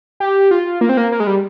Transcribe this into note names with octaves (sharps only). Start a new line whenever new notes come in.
G4
F4
A#3
C4
A#3
A#3
G#3
G3